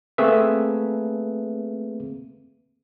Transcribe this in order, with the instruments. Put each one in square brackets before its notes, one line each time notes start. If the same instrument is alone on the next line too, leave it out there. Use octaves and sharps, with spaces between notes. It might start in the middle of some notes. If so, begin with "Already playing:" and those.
[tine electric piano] A3 A#3 C4 G#4 B4 E5